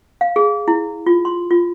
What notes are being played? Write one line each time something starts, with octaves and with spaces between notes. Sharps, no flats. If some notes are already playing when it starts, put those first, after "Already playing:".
F5
G#4
E4
F4
C6
F4